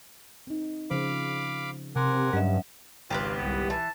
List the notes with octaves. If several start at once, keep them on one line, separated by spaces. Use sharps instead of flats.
C4 D#4
C#3 F3 C5 F5 B5 D6
C3 A#4 F#5 G#5 C6 D6
G2 F#3 C#4 D#5 E5
G#1 C#2 F4 G4 A#4 B4
C2 B3
E3 A5